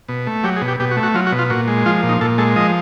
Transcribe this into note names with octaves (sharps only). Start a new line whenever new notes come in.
B2
A3
F#3 G4
G#4
B2
G4
B2 G4
F#4
A3
F#4
F#3 F4
F#4
B2
F4
A#2 F#4
G#3
F3 F4
A#2
D#4
A#2 A4
G#3 A4
F3 D#5